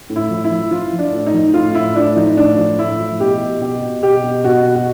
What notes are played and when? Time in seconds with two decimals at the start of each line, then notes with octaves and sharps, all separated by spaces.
0.10 A2
0.16 E4
0.30 F3
0.44 E4
0.51 F3
0.71 F3 F4
0.93 F3
0.99 D4
1.12 A2
1.26 D#4
1.34 F3
1.54 A2 F4
1.75 A2 E4
1.95 A2 D4
2.16 F3 D#4
2.37 A2 D4
2.58 F3
2.79 A2 E4
2.99 F3
3.20 B2 G4
3.41 B2
3.61 B2 G4
3.82 B2
4.03 B2 G4
4.23 B2
4.44 B2 F#4
4.65 B2
4.75 F#4